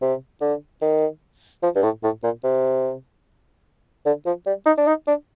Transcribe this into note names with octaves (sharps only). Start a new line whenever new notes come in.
C3
D3
D#3
F3
G2
A2
A2
A#2
C3
D3
F3
G3
D#4
D4
D#4
D4